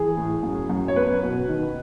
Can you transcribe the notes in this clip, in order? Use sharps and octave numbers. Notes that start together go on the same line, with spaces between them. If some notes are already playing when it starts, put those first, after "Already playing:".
Already playing: E3 G#4
A2
F#2
F#2
C#5
B3 B4
B2
D#3